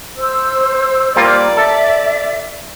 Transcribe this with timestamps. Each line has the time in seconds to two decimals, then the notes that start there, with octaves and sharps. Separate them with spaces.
0.18 C5 E6
1.16 G3 A#3 F4 D5
1.57 A4 E5